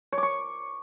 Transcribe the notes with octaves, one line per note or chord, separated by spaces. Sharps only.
C#5
D6
C#6